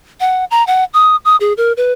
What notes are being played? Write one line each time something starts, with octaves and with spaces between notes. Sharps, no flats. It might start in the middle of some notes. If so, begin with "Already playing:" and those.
F#5
A#5
F#5
D#6
D#6
G#4
A#4
B4